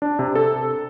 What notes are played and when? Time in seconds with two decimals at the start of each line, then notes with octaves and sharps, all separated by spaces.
0.02 D4
0.19 C3
0.35 A4